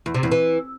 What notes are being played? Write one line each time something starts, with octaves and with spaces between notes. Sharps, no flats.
E2
C3
E2
E3